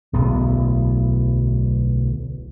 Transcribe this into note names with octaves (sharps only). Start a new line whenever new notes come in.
D1 B1 B3